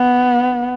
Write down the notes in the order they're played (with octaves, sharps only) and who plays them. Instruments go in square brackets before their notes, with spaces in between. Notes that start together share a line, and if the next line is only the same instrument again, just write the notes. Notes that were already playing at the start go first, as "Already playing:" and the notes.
Already playing: [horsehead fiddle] B3